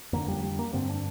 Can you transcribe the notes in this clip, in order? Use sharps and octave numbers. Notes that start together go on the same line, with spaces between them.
F2 D3 A#3
G3
G3
A#3
G2 D3 C4
D4